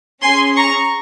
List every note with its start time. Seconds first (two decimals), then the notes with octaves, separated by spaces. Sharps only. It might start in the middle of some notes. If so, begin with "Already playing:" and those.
0.22 C#4 G#4 G#5 C6
0.56 A#5 C#6